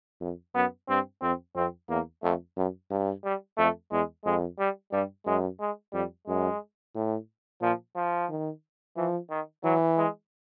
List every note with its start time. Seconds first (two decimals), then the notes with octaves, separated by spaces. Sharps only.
0.21 F2
0.55 F#2 B3
0.89 G2 C4
1.22 F2 C4
1.56 F2 C4
1.89 E2 A#3
2.23 F2 A3
2.57 F#2
2.90 G2
3.24 G3
3.58 F2 A3
3.91 E2 G#3
4.25 F2 G#3
4.59 G3
4.92 G2 G3
5.26 F#2 G#3
5.60 G#3
5.93 F2 G3
6.27 F#2 G#3
6.95 A2
7.61 A#2 F3
7.96 F3
8.29 D#3
8.97 E3 F3
9.30 D#3
9.64 E3 F#3
9.98 G#3